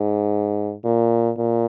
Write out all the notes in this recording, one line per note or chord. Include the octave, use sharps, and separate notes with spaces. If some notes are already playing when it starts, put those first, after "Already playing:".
Already playing: G#2
A#2
A#2